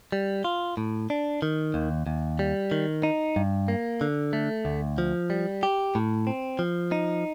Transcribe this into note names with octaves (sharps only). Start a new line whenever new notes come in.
G3
F4
A2
D4
D#3
D#2
D#2
G3
D#3
D#4
G2
A#3
D3
A3
D2
F3
G3
G4
A2
C4
F3
D#4